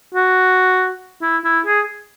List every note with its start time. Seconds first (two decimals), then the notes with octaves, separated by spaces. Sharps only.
0.15 F#4
1.22 E4
1.45 E4
1.66 G#4